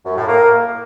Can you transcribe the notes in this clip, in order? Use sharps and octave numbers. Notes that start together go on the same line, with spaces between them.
F#2
A2
A#3